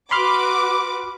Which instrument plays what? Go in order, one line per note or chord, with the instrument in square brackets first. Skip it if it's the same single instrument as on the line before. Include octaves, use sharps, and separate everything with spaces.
[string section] F#4 B4 D6 [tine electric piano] B5 C6 F6